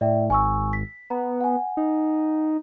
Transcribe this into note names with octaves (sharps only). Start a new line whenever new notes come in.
A2 D5 E5 G5
G#1 G#5 C#6 E6
B6
B3 A#5
F#5 G#5
D#4